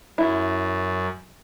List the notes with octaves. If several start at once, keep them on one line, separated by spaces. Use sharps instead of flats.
F#2 E4